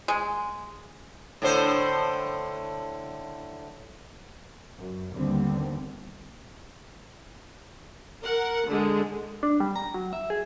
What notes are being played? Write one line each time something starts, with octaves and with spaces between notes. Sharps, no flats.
G#3
A2 D3 C5
F#2
D#2 D3 D#3 G3 B3 C4
A#4 F#5
D3 G#3
D4
G3
A#5
F#3
E5
G#4